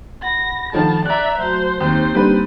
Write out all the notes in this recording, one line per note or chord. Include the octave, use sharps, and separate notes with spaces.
F#5 B5 A#6
D#3 F3 A3 A5
D5 E5 A#5 F#6
F#3 A3 F#4 C5
D#2 A#3 C4 D#4 C5
D3 G3 B4